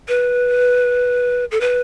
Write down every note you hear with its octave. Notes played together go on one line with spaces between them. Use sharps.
B4
A4
B4